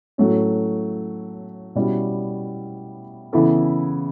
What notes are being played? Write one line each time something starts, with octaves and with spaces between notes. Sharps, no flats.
A2 F#3 A3 C#4
B2 G3 C#4 E4
C#3 E3 B3 E4 A4